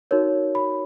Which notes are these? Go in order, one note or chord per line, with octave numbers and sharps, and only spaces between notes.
D#4 F#4 A#4 C#5
B5